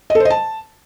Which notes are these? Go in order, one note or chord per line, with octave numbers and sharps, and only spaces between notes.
D#5
A4
C5
D#5
A5